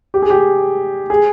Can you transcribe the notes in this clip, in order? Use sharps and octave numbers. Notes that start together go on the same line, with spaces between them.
G4
G#4
G4
G#4